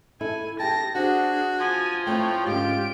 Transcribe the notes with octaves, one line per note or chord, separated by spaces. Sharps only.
E4 A4 G#5
G4 G#4 G5 A5 A#6
D4 F#4 G#4 C5 F#5 A5
F3 G#5
A3 C4 E4 C#5 G5
G#2 D3 C#4 F4 G4 D7